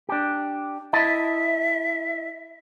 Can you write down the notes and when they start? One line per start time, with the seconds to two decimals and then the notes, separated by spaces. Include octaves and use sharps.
0.09 D4 G4
0.93 E4 D#5 E5 A5